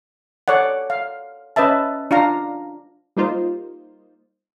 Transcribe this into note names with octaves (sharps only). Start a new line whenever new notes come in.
A4 C#5 D5 F#5
F5
C#4 B4 D#5 E5 A5
D4 F4 F5 A#5
G3 A#3 D#4 F4 C5